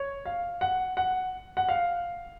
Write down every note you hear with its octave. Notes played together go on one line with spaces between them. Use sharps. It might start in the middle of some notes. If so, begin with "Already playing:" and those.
Already playing: C#5
F5
F#5
F#5
F#5
F5